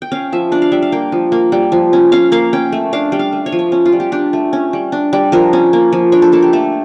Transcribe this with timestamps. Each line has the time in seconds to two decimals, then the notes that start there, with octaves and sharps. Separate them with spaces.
0.02 G5
0.12 C#4 F5
0.32 F3 E5
0.52 D4 D5
0.62 F5
0.72 G3 E5
0.82 F5
0.92 A#3 G5
1.12 F3
1.32 A#3
1.52 G3
1.72 F3
1.93 C#4
2.12 C#4 F5
2.32 A#3 F5
2.53 C#4 G5
2.72 A3
2.93 D4 F5
3.12 G3
3.19 F5
3.32 A3
3.46 C#5
3.52 F3
3.59 C#5
3.72 C#4
3.86 F4
3.92 G3
4.00 G4
4.12 D4 G4
4.33 A3
4.53 C#4
4.73 G3
4.92 D4
5.13 G3
5.32 F3 A#4
5.53 C#4
5.73 A#3
5.92 F3
6.12 D4 C#5
6.22 A4
6.32 A#3 A4
6.43 G4
6.53 A3 A4